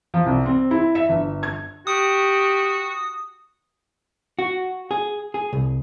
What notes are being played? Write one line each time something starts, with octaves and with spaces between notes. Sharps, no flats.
F3
C2
C4
E4
E5
G1
G#6
F#4 G4 D#6
F#4
G#4
G#4
C2